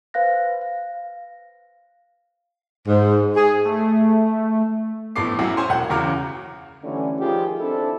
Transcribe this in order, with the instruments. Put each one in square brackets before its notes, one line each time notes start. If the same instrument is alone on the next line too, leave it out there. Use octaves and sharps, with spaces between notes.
[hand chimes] B4 C5 F5 F#6 A#6
F5
[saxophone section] G#2
G#4
[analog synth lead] A3
[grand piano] A#1 A2 A3 B3 D6 C7
F#2 F#3 E4 F#4
C5 C#5 G#5 C6
E1 F#5 G6
E2 C#3 F#4 A#5 D6 F6
[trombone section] D3 E3 G3 A3 C#4
D#3 F3 G3 F4 G4 G#4
C4 D4 E4 A4